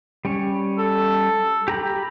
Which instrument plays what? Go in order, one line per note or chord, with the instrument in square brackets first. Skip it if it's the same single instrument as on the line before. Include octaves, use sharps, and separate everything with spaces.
[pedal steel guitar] G3 C#4 C#5
[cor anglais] A4
[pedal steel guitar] G4 A#5 B5